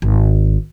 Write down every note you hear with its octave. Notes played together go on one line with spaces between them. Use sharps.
G#1